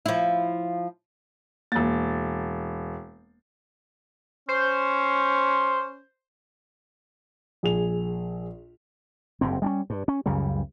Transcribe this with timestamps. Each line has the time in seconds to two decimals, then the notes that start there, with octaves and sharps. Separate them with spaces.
0.06 F3 E4
1.72 E1 A#3 A6
4.48 C#4 C5
7.63 A#1 G#4 F7
9.41 F#1 G2 C4
9.62 G3 C4 C#4
9.90 G2
10.08 C#4
10.26 C#2 F#2 C#3 G3